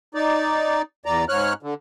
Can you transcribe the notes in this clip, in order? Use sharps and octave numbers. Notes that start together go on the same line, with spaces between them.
D#4 D5
E2 D5 A#5
G#2 C#5 F6 F#6
D3